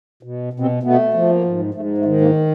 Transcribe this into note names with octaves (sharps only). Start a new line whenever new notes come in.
B2
B2
C3 C4
B2 A3 B3
F3
A#3
G#2
G#2 A3
A3
D#3
A#3